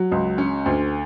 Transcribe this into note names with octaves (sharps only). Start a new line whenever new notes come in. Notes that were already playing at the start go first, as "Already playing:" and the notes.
Already playing: F#3
C#2
C#4
D2